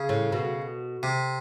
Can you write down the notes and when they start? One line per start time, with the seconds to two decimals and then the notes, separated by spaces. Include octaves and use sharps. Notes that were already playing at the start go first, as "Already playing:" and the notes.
Already playing: C#3
0.09 A2
0.32 B2
1.03 C3